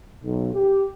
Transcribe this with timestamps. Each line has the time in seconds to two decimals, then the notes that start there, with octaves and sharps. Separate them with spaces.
0.23 B1
0.54 G4